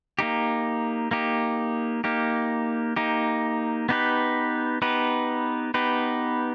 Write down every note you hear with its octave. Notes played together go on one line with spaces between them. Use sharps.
A#3 D#4 G4
A#3 D#4 G4
A#3 D#4 G4
A#3 D#4 G4
B3 D#4 G4 B4
B3 D#4 G4 B4
B3 D#4 G4 B4